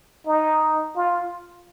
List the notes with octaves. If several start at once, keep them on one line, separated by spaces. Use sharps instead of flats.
D#4
F4